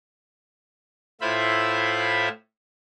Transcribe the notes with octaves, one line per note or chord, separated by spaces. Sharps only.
A2 E4 F4 C5 E5 B5